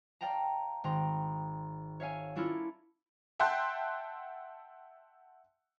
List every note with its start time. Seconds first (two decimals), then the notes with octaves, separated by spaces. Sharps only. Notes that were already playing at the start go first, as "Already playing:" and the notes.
0.21 D5 F5 G5 A5 A#5
0.84 G#1 G5 A#5 C6
2.00 C#5 E5 F5 G#5
2.35 C#4 D4 E4 F4 A4 A#4
3.39 E5 F#5 G5 A5 C6 F#6